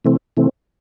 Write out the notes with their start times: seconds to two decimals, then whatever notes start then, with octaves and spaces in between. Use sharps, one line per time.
0.05 C3 E3 A3 C4
0.37 C3 E3 A3 C4